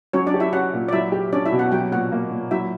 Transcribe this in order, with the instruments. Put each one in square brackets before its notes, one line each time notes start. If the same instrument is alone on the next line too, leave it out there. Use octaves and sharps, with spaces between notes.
[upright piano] F#3 [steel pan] C#4 C#5
[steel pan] D4 D5
[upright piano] G4
[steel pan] E4 E5
[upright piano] C#4 [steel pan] F#4 F#5
[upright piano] A#2
[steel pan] D5
[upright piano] F#3 [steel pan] E4 E5
[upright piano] G4
[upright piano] C#4 [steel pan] D4 D5
[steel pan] E4 E5
[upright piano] B2
[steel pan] F#4 F#5
[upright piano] F#3 [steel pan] G4 G5
[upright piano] A#2 [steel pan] F#4 F#5
[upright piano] A#3
A#2
[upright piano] F#3 [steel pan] E4 E5